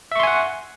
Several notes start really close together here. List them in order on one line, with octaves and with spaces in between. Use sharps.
E5 C#6 C6 G#5 F#5